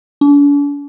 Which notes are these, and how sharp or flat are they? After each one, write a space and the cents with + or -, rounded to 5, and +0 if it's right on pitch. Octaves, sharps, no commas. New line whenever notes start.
D4 -45